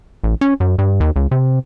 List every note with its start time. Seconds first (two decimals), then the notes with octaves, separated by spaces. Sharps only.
0.24 A1
0.41 C#4
0.60 F#2
0.79 G2
1.00 D#2
1.16 C#2
1.31 C3